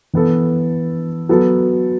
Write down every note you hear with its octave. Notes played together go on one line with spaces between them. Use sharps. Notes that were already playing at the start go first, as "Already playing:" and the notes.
E3 B3 A4
F#3 B3 A4